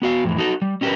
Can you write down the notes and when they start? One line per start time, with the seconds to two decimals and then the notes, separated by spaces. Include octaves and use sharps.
0.02 B3 F#4 F5
0.24 F2 A2 E3
0.38 D#4 F#4 A4
0.62 G3
0.81 C#4 D#4 G4 G#4 A#4 B4